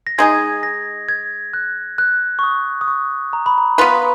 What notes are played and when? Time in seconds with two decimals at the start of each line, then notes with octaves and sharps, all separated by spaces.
0.07 A#6
0.18 G#3 D#4 G#4 G#6
0.63 A#6
1.09 G#6
1.54 F#6
1.98 F#6
2.39 C#6
2.43 D#6
2.81 D#6
2.88 C#6
3.33 A#5
3.46 B5
3.58 A#5
3.78 B3 F4 B4